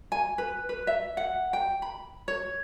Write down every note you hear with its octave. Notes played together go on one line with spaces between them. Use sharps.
G#5
B4
B4
E5
F#5
G5
B5
C#5